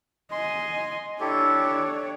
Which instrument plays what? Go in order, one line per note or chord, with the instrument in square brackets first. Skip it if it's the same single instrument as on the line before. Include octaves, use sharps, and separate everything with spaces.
[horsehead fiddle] D#5 G#5 [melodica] C6
[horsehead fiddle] D4 C#5 [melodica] E4 G4 A4